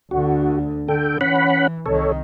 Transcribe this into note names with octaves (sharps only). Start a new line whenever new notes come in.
D2 D3 F#4
D3 A4 G5
E3 C#4 F#5 B5
C2 D#3 A4 C#5